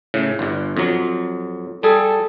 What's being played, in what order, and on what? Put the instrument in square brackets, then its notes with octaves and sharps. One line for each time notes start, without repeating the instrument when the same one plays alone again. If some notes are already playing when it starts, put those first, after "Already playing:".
[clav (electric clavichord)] A2 C#3
G1 G2
F2 F#3
[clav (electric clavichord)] G3 G#4 [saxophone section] A4